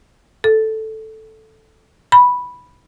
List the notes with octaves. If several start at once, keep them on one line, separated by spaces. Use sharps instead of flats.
A4
B5